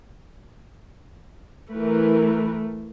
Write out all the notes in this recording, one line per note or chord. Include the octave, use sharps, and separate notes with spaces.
E3 A3 A#4 B4